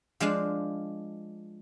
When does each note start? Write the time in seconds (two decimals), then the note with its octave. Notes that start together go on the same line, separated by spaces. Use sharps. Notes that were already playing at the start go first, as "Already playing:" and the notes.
0.20 F3 G#3 D4 F5